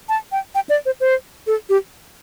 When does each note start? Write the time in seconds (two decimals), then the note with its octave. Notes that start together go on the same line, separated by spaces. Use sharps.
0.09 A5
0.32 G5
0.55 G5
0.69 D5
0.86 C5
1.00 C5
1.47 A4
1.69 G4